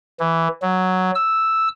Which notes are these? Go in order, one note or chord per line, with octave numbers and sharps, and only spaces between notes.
E3
F#3
E6